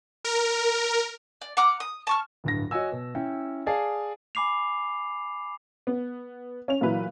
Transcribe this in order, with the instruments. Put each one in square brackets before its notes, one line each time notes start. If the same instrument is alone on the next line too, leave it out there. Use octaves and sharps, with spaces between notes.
[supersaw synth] A#4
[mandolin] D5
F#5 A#5 D6 F6
D#6
A5 C#6 F6
[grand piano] D1 G2 A#6
F#4 C#5 D#5 G#5 E6
B2
C#4 E4 G5
G#4 D5 F5 G#5 A5
[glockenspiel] G#5 B5 D6 C7 F7
[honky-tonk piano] B3
C#4 F7
A#2 E3 F#3 E4 B4